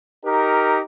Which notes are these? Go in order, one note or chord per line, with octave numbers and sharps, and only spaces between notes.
D#4 G4 A#4